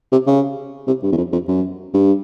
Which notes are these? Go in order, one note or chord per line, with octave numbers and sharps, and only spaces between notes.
C3
C#3
C3
G2
E2
F2
F2
F#2
G2